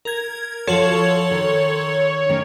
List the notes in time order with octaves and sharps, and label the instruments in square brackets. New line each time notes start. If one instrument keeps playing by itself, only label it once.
[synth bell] A#4 G#6
[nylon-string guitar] F3 F#4 [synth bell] A4 C6 F#7 [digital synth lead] C#5
[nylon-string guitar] D#3
D#3 A3 C#4